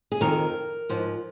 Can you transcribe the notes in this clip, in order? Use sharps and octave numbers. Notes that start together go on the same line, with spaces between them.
G#4
F2 D#3 A#4
G#2 F3